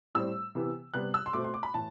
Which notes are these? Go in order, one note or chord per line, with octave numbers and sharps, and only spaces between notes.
A2 G3 C4 E6
C3 E3 B3
C3 G3 B3 F#6
E6
C6
B2 A3 C4 D6
C6
D6
B5
A2 E3 A5